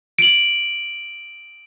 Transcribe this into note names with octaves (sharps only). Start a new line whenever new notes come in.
D7 F#7